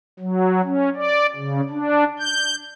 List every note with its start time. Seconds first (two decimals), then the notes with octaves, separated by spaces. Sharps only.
0.20 F#3
0.64 C#4
0.96 D5
1.36 C#3
1.70 D4
2.20 G6